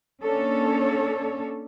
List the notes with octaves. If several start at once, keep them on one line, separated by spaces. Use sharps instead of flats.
A#3 C#4 D4 A4 C#5